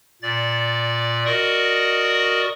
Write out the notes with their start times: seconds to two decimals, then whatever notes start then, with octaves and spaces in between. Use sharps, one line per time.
0.22 A#2 D5 A6
1.26 F#4 A#4 D5 D#5 C#6 D#6